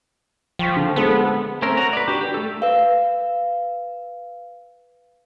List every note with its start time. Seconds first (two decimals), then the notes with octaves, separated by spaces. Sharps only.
0.59 F3 G5 C#6 B6
0.76 D3
0.96 G#3 B3 A4 C5
1.62 A3 C4 C#4 A#4
1.77 F#4 A#5
1.93 B4 D5
2.08 D4 F#4 G4
2.21 G4
2.34 A3 A4
2.62 B4 F5